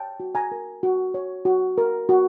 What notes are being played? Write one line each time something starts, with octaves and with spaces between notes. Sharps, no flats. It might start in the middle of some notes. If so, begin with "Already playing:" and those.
Already playing: C#5 G5 A5
F#4
G#5 A#5
A#4
F#4
C#5
F#4
A#4
F#4